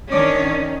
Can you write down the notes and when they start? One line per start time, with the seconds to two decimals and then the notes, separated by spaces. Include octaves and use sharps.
0.12 D#3 C#4 D4 C#5 D5